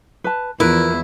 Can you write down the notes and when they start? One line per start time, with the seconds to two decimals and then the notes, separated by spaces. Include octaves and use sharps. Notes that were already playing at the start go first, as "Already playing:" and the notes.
0.24 B4 A5
0.60 E2 F3 E4 A#4 B4